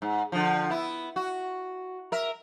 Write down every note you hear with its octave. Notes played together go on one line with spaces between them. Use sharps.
G#2
D3 F3
B3 E4
F#4
A#4 E5